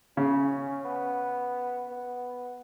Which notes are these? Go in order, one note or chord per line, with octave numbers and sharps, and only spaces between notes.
C#3 C#4
B3
B3